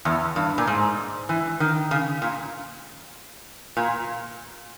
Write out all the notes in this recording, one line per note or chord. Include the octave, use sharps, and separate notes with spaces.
E2
G2
A#2
G#2
E3
D#3
C#3
A#2
A#2